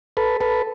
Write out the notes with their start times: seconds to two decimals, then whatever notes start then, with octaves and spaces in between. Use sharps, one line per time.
0.17 A4 B4
0.40 A4 B4